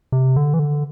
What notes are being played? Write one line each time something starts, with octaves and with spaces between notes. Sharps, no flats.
C3
D3
E3
D3